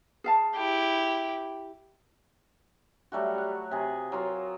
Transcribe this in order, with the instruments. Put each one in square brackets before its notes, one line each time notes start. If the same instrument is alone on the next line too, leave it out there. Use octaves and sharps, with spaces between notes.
[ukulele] G#4 F5 A5
[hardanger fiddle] E4 G4
[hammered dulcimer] F#3 G3 A3 F#4
C#5 F#5
C3 G#4
F#3 F4 A#4